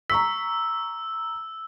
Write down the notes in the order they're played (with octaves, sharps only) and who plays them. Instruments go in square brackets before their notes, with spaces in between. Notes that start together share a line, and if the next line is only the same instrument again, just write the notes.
[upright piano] A#5 C#6 B6 [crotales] E6